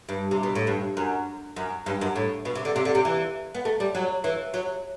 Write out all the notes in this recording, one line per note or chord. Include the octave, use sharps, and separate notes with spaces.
G2
C3
B2
A2
G2
F#2
F#2
G2
F#2
A2
B2
C3
D3
C3
D3
C3
E3
B3
A3
G3
F#3
E3
F#3